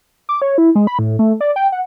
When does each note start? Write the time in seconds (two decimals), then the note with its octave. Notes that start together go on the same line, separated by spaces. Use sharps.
0.29 D6
0.42 C#5
0.58 E4
0.75 G#3
0.87 B5
0.99 A2
1.19 A3
1.41 D5
1.56 G5
1.72 F#5